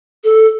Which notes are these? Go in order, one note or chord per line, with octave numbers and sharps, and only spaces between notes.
A4